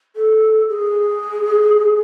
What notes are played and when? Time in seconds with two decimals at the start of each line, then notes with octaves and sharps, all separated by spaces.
0.16 A4
0.69 G#4